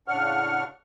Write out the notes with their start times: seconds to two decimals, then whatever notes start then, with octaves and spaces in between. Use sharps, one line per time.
0.08 A2 C#3 D4 F#5 C#6 F6